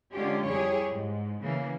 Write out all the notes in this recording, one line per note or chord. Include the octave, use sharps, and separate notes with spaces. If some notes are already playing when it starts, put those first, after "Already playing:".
D3 G#3 C#4 F4 G4
F2 G3 E4 G4 G#4 C#5
G#2
C#3 E3 A#3